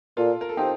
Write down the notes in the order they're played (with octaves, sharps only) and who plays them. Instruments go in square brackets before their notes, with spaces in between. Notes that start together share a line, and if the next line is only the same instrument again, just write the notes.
[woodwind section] A#2 [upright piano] F4 A4
[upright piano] A#4
A4
[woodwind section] F3 C4 [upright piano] D#4 G4